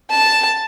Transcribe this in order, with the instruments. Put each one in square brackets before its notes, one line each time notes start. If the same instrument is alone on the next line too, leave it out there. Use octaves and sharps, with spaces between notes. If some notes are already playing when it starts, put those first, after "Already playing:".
[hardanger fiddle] A5